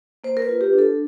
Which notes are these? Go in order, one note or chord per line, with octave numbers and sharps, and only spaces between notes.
A#3 C5
A#4
B4
F4
G4
D4
A4